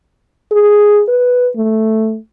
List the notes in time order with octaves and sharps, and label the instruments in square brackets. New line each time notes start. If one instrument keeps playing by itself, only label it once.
[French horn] G#4
B4
A3